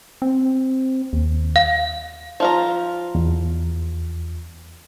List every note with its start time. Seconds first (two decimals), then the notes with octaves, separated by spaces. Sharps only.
0.22 C4
1.13 D#2
1.56 F5
2.40 F3 F4 A#5
3.15 E2